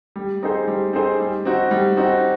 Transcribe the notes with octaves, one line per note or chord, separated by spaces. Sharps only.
G3
C4 D#4 G#4 C5
G3
C4 D#4 G#4 C5
G3
C4 D#4 F#4
G3
C4 D#4 F#4